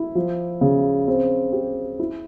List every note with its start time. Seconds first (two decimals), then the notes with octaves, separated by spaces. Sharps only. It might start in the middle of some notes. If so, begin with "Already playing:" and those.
Already playing: E4
0.15 F3
0.61 C#3
1.08 C4
1.53 G4
2.00 E4